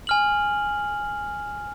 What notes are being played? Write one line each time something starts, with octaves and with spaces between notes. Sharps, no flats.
G#5 F6 F#7